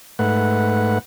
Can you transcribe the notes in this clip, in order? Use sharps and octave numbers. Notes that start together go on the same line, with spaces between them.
G#2 A3 B4 F#5